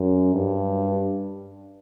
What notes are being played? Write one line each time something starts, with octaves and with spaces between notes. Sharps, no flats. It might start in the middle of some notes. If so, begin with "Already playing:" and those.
Already playing: F#2
G2